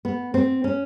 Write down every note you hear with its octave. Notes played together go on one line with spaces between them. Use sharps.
B3
C4
C#4